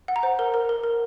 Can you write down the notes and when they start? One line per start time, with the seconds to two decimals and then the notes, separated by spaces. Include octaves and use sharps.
0.08 F#5
0.16 A#5
0.23 C5
0.39 A#4
0.54 A#4
0.69 A#4
0.83 A#4